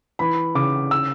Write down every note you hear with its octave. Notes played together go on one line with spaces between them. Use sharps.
E3 B5
C#3 D6
E6